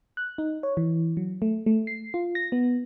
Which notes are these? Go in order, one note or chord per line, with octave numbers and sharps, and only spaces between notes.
F#6
D#4
C#5
E3
F#3
A3
A3
C7
F4
A#6
B3